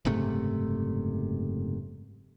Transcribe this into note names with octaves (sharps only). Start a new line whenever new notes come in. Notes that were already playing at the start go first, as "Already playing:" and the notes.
F#1 G#2 C3 A3